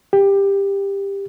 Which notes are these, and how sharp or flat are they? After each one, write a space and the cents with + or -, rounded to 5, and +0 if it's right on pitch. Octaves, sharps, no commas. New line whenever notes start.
G4 +15